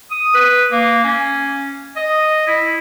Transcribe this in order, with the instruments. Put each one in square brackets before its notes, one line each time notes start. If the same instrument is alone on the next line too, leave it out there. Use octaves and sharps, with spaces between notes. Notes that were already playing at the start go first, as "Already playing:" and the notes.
[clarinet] D#6
B4
A#3
C#4
D#5
E4